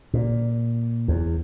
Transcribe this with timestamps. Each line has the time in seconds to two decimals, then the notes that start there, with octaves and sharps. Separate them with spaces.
0.14 A#2
1.08 E2